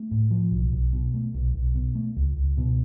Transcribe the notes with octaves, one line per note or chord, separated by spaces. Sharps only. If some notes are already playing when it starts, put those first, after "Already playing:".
Already playing: A3
A2
F3
B1
B1
B2
A3
B1
B1
B2
A3
C#2
C#2
B2